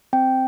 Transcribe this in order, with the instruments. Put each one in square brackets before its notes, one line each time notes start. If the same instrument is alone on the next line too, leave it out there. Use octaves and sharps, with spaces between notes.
[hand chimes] C4 G5